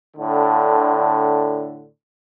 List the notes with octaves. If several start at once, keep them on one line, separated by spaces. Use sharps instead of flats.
A2 D3